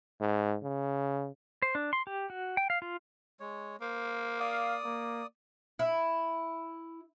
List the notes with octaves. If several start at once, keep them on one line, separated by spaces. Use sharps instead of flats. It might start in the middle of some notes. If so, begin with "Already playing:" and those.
G#2
C#3
C5
D4
C6
G4
F#4
G5
F5
F4
G#3 C#5
A#3 C5
D5 F5 D#6
A#3
E4